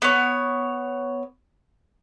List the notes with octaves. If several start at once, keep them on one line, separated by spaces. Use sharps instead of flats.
B3 C#5